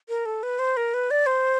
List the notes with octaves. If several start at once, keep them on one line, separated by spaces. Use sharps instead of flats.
A#4
A4
B4
C5
A#4
B4
D5
C5